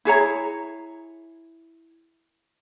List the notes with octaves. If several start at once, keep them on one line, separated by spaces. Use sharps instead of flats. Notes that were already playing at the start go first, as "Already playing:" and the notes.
E4 G#4 C#5 A#5